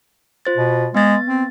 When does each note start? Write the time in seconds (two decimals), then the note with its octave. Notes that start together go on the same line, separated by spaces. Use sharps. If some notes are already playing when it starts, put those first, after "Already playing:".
0.45 F4 C5 A6
0.58 B2
0.94 G#3 B3 A6
1.28 C4